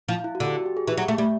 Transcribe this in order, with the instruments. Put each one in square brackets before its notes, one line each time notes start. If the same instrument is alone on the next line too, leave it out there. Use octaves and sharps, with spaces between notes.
[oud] F3 [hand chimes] E4
[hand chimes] E4
F#4
[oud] D3
[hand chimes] G4
F#4
G4
G#4
[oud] E3 [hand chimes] G4
[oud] F#3
A3
G3